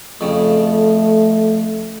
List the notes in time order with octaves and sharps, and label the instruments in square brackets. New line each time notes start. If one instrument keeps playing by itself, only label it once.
[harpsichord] F2 C#3 [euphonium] A3